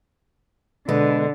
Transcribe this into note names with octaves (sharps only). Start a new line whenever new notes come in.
B2 D3 G#3 B4